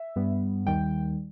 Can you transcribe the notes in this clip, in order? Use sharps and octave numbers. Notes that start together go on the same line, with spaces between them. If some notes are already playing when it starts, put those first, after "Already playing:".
Already playing: E5
G2 G3 B3
D#2 D#3 G3 G5